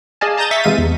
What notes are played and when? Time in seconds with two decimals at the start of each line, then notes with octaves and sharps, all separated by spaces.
0.21 G#4 D5 D#5 F5 G#5 A5
0.37 A5 A#5 D#6 G6 A6
0.51 E5 C#6 A6 B6
0.64 C3 E3 G#3 F5 D#7
0.78 E2